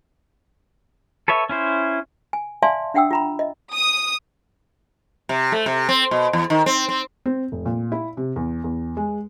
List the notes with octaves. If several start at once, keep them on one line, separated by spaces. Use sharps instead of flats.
A4 B4 C#5 E5
C#4 E4 C5
G#5
D5 E5 F5 G#5 A5 C6
D4 E5 F#5 G5 D#6 E6
F4 A#5 B5
D#5 E5
D#6
C3
A3
C3
C4
B2
E2
D#3
C4
C4
C4
F1
A#2
E4
C3
E2
E2
G#3